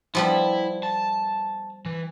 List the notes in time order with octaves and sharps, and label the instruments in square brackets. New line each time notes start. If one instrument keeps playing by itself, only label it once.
[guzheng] F3 G3 B3 [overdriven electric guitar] E4
[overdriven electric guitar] A5
E3